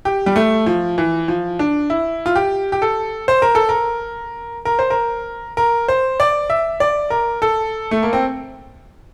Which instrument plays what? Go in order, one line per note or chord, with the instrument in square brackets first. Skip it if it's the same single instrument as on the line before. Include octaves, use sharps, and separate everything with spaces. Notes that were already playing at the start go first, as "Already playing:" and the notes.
[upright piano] G4
G3
A3
F3
E3
F3
D4
E4
F4
G4
G4
A4
C5
A#4
A4
A#4
A#4
C5
A#4
A#4
C5
D5
E5
D5
A#4
A4
A3
A#3
C4